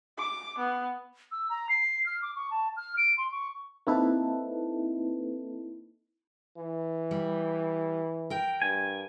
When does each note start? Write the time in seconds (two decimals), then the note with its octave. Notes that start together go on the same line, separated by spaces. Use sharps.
0.18 D6
0.58 B3
1.31 E6
1.49 A#5
1.69 C7
2.06 F6
2.22 D6
2.36 C#6
2.51 A5
2.77 F6
2.97 D7
3.18 C6
3.32 C#6
3.87 A#3 C4 D#4 E4 A4 B4
6.57 E3
7.11 G3
8.30 A#4 G5
8.62 G2 G#5